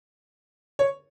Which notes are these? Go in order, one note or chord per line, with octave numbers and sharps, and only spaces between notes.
C#5